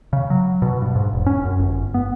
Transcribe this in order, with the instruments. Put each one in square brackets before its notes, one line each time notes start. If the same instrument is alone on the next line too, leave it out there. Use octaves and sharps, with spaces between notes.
[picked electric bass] C#3
F#3
B2
G2
G#2
E1
C#4
F#2
G1
B3